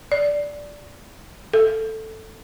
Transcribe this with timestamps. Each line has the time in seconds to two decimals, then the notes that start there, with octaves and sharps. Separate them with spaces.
0.12 D5
1.53 A4